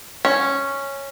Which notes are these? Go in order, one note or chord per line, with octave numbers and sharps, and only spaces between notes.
C#4